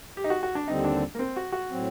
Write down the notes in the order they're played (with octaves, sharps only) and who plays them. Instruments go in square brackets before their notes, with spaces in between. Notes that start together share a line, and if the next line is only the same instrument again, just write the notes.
[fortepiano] G4
D#4
F#4
F#4
D4
[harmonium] D#2 D3 G3 C4 [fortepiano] D#4
[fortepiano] D4
A#3
C4
F#4
F#4
[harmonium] A2 F#3 C4